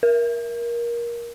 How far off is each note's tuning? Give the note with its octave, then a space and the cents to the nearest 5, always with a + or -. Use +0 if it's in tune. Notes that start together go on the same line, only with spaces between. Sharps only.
A#4 +20